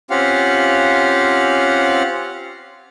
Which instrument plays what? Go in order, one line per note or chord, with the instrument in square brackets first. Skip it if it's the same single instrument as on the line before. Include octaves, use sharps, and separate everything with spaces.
[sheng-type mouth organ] C4 C#4 F4 G4 F5 F#5